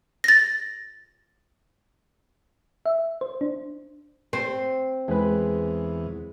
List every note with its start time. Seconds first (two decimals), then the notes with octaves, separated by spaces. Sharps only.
0.24 A6 A#6
2.86 E5
3.21 C5
3.41 D4
4.33 C4
5.08 E2 G#3 B4